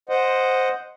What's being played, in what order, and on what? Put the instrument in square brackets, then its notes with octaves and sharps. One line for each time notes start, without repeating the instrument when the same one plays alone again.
[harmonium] C5 D#5 F#5